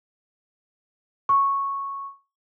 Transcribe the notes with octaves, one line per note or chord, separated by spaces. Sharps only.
C#6